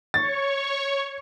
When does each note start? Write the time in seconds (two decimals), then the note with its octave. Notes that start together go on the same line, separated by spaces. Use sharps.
0.14 C#5 C#6 A6